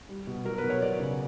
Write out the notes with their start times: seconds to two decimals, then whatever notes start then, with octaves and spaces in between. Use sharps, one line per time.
0.09 G3
0.27 B2
0.45 F#3 A#4
0.58 B4
0.64 B2
0.70 C#5
0.82 F#3 D5
1.00 C#3